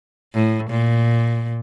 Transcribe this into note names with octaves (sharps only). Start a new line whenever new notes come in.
A2
A#2